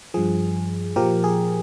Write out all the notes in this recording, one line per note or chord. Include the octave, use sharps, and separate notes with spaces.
G2 F3 G#4
A#2 F3 G4 A#4
G#4